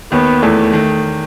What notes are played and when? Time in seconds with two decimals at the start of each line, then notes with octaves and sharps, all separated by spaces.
0.11 D#2 D#3 B3
0.42 E2 E3 A3
0.73 D#3